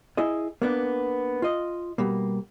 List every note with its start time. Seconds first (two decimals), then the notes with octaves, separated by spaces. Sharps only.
0.17 E4 G#4 D#5
0.62 A#3 B3 D4
1.42 F4 D#5
1.98 B2 G3 A#3